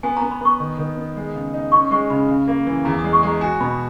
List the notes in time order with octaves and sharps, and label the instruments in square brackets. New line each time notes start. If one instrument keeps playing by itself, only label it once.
[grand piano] B3 [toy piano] G#5
[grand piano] B3 [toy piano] A#5
[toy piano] B5
[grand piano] B3 [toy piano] C#6
[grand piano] D#3
D#3
B3
G#3
C#3
D#4
[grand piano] C#4 [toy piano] C#6
[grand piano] G#3 [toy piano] C#6
[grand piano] C#3 [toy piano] B5
[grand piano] C#3
A#3
E3
[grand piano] E2 [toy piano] A#5
[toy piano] D#6
[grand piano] G#3
[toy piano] C#6
[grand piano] G#3 [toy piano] A#5
[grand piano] F#4 [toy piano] G#5
[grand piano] B2 [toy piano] B5